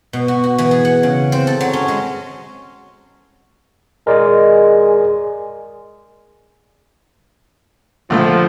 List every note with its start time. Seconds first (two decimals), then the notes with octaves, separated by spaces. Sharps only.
0.13 B2
0.28 F#4
0.44 F#4
0.58 E3
0.71 G#4
0.85 F#5
1.03 C#3
1.32 C4
1.47 A4
1.61 F#3
1.73 C#4
1.88 G#3
4.07 G#3 A#4 D5 D#5
8.10 A#1 D3 F3 A3